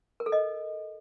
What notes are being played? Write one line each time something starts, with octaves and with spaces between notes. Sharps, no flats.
A#4
A4
D#5